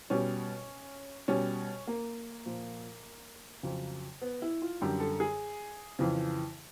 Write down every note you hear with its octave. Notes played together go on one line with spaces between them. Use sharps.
B2 G3 C#4
B2 G3 C#4
A#3
A#2 F3
F2 C#3 F#3
B3
E4
F4
F#2 D3 G3 G4
A4
G#4
F2 C#3 E3